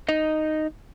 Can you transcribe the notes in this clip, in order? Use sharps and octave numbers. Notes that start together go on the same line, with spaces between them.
D#4 D#5